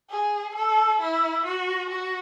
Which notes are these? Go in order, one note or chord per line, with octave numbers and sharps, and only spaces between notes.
G#4
A4
E4
F#4
F#4